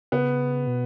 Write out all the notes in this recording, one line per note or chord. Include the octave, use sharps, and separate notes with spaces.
C#3 B3
B2